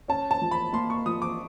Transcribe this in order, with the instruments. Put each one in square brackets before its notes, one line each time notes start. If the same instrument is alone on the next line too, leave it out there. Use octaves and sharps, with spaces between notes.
[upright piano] C#4 [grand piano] A5
[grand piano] A5
[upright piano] F3
[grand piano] B5
[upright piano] A#3 [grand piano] C6
[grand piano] C#6
[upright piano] F3 [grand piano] D#6
[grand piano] D6